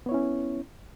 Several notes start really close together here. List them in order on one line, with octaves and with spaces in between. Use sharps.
B3 C#5 E4 C#4